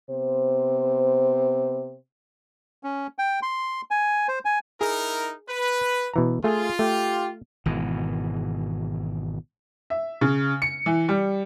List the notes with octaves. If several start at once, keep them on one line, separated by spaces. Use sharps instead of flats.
C3 B3 C5
C#4
G5
C6
G#5
C5
G#5
D#4 E4 G#4 A#4
B4
B2 E3 A#5
A3 F4 G#4
A3 G4
G#1 B2 E3
E5
C#3
C#7
E3
G3